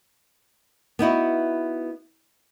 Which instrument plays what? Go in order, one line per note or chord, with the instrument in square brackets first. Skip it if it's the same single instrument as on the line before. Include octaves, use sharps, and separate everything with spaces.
[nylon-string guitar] B3 D#4 E4 F#4